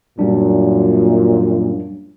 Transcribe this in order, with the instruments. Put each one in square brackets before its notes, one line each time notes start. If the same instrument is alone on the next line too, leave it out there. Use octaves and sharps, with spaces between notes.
[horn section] F#2 A#2 [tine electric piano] G3 D4